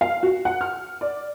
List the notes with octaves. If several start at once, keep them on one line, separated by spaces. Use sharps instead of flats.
F5
F#4
F#5
F6
D5